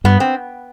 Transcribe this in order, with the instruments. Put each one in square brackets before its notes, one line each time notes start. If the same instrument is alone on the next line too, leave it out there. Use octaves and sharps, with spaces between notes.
[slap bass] G2 [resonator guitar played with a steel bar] B3
[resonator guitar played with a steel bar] C4